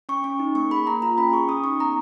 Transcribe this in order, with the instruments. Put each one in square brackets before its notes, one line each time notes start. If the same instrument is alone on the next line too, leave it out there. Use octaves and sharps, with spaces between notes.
[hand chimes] C#4 C#6
C#4 C#6
D#4
A#3 C#6
G#4 B5
A#3 A#5
F4 A#5
C#4 B5
G#4 C#6
C#4 D#6
D#4 C#6
B3 A#5